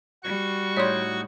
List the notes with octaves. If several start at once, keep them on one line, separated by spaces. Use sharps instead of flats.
G3 F#4 C#6
A2 D#4 C#5 D5 C6